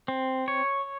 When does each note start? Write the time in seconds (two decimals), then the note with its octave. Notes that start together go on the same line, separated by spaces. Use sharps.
0.08 C4
0.48 C#5